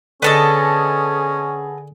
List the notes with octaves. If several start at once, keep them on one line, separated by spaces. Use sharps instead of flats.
D3 B3 C#4 G#4 A4 D#5